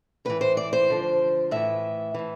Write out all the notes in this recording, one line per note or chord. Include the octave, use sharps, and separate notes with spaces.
A2 E3 B4
C5
D5
C5
D2 D3 F3
A2 E3 E5
A2 E3